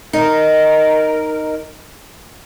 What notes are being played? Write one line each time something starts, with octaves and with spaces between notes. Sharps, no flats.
D#4 A#4